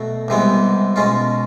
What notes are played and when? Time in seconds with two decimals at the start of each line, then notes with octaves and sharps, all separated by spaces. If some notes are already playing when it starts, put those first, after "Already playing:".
Already playing: B2 F#3 A3
0.28 C2 C3 E3 G#3 B3
0.96 B2 G#3 C#4 F4